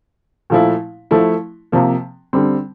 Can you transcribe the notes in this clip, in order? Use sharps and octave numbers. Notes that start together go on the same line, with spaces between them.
A#2 F3 A3 E4
F3 A3 E4
C3 F3 A#3
D3 G3 C4